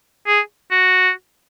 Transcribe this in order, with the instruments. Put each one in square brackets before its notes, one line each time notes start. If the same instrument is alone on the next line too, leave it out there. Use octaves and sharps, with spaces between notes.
[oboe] G#4
F#4